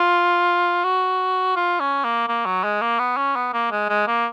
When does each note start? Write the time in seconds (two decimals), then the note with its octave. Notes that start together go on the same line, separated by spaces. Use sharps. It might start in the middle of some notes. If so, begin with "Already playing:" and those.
Already playing: F4
0.84 F#4
1.56 F4
1.80 C#4
2.04 A#3
2.28 A#3
2.46 F#3
2.64 G#3
2.82 A#3
2.99 B3
3.17 C#4
3.36 B3
3.53 A#3
3.71 G#3
3.89 G#3
4.07 A#3